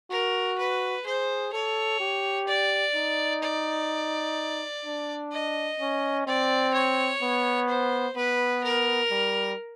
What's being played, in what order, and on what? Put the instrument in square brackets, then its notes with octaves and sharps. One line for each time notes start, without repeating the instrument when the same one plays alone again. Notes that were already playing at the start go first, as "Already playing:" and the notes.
[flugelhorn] F#4 [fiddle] A#4
[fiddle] B4
[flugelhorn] G#4 [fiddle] C5
[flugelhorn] A4 [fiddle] C#5
[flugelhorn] G4
[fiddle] D5
[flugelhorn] D#4
[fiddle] D5
[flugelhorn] D4
[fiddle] D#5
[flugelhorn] C#4
[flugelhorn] C4 [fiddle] D5
[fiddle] C#5
[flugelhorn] B3
[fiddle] C5
[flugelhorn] B3 [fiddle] B4
[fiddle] A#4
[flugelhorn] G3